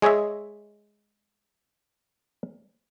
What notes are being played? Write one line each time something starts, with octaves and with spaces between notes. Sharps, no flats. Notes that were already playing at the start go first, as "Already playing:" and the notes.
G#3 G#4 C#5 D#5 E5